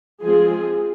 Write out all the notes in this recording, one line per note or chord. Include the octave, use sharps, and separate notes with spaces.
F3 G#3 C4 G#4